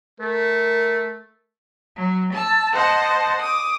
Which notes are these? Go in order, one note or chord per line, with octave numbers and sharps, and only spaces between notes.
A3 A#4
F#3
A5 E6
C5 D#5 F#5 A5
D6 D#6